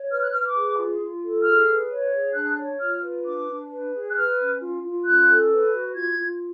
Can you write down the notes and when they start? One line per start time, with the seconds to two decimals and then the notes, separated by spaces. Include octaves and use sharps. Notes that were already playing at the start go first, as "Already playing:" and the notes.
Already playing: C#5
0.09 B4 F6
0.20 F#6
0.31 B4 F6
0.43 D6
0.55 G#4
0.76 F4
0.99 F4
1.22 A4
1.44 G#4 F6
1.67 B4
1.89 C#5
2.12 G#4
2.34 D4 F#6
2.57 C#5
2.80 F4 F6
3.02 B4
3.24 D4 D6
3.47 D4
3.69 B4
3.92 G#4
4.09 F#6
4.15 B4 F6
4.38 C#4
4.60 F4
4.83 F4
5.04 C#4 F#6
5.28 A4
5.51 B4
5.72 F#4
5.95 F4 G#6
6.18 F4